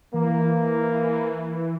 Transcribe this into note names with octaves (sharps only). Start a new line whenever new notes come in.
E3 A#3